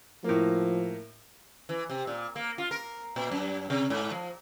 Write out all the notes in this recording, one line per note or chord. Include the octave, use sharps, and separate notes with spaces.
A2 F3 A#3
E3
C3
A#2
A#3
F4
A#4
A#2
F#2
C3
G#2
F3